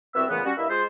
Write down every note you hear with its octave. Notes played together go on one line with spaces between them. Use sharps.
C2 B3 C4 F#4 E5 E6
A#2 C#3 E3 A3 B3
G3 C#4 F#4
G2 A#3 E4 D#5 E5
G#3 F4 C5